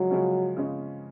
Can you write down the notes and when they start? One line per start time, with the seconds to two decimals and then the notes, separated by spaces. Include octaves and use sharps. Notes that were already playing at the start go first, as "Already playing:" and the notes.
Already playing: C#3 F3 F#3 G#3
0.11 C#3 F3 G#3 C#4
0.57 C#3 F3 G#3 C#4